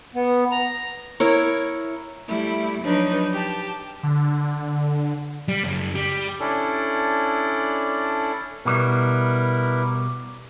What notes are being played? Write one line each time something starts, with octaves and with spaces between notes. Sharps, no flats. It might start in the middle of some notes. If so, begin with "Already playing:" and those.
B3
A#5
E4 A#4 C#5
G3 A3 E4
F3 F#3 D4 D#4 B4 C#5
G4 A5
D3
G3
F#2 C#3
G3
C#4 D4 E4 A4 D5
B2 G3 E4 A#4 B4